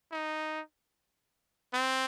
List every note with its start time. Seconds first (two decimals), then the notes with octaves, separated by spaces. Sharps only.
0.12 D#4
1.73 C4